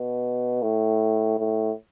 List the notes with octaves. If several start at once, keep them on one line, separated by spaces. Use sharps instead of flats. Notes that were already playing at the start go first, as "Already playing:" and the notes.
Already playing: B2
A2
A2